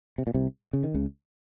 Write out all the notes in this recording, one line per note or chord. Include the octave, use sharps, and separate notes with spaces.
C3
A#2
C2 C3
C#3
D#3
C#2 C#3